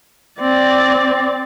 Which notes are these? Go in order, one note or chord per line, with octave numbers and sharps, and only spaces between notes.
C4 D5